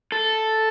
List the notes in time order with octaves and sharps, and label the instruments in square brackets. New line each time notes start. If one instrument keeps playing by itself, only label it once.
[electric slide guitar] A4